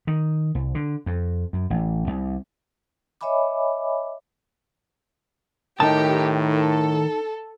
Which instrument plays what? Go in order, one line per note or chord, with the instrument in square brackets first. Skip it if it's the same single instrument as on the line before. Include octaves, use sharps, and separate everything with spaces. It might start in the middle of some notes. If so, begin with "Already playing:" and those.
[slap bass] D#3
C2
D3
F2
F#2
A1
C2
[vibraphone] C#5 D#5 E5 G#5 B5 D6
[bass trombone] A2 [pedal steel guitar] D#3 A#4 D#6 [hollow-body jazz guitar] D#4 A5 [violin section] G4
[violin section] A4